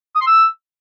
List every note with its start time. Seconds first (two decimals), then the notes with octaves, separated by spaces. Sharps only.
0.15 D#6
0.21 C6
0.27 E6